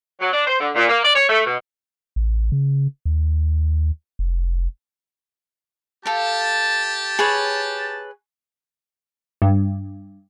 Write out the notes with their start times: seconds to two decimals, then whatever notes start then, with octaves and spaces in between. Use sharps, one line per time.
0.20 F#3
0.33 D4
0.47 C5
0.60 D3
0.75 A#2
0.89 A#3
1.04 D5
1.16 C#5
1.29 A3
1.47 B2
2.16 A1
2.52 C#3
3.05 D#2
4.19 F1
6.06 G4 A4 F5 A5
7.19 G#4 B4 C#5
9.42 G2